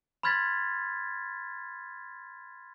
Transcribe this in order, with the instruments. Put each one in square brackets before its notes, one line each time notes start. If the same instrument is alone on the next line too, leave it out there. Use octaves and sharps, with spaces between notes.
[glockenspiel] B5 C6 F6 G#6 A6 B6